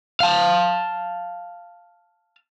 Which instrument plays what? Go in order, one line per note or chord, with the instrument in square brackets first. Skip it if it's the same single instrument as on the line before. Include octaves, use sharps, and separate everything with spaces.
[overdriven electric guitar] F5 A5